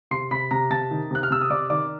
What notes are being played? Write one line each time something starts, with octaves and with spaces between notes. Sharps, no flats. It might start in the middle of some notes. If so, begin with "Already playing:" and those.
C3 C6 C7
C3 B5 B6
C3 A#5 A#6
C3 A5 A6
D#3
C3 F#6
F6
C3 E6
D#6
C3 D5 D6
D#3 D5 D6